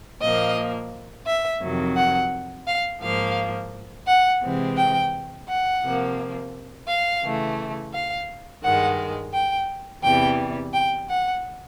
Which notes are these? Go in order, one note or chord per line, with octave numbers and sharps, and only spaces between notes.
A#2 F3 A#3 D#5
E5
F2 C3 D#3 F#3
F#5
F5
G#2 F3 A#3 F5
F#5
C3 E3 G#3 C4
G5
F#5
C3 F3 A#3
F5
C#3 E3 A3
F5
G2 D#3 G#3 F#5
G5
E2 C3 E3 G3 G5
G5
F#5